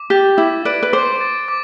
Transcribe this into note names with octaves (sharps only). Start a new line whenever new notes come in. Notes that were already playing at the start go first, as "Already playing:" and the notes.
Already playing: D6
G4 A6
E4 D6
B4 D5 D7
B4
C5 D6
A6
D6